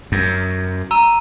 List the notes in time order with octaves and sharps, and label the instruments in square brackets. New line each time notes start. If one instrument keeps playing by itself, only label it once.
[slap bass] F#2
[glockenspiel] A#5 E6 D#7